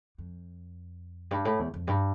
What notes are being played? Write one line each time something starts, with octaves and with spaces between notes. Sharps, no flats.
F2
G2
A2
E2
F2
G2